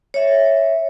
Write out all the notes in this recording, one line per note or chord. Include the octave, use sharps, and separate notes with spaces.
C#5 E5